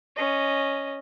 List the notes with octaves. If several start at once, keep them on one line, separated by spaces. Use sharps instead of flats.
C#4 D#5